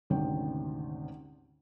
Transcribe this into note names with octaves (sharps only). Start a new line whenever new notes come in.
G#1 D2 C3 C#4 G5